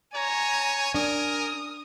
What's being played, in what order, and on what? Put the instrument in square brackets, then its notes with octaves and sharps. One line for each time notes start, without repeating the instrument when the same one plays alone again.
[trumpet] C#5 [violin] G#5 [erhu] A#5
[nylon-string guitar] D4 [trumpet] A#4 [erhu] D#6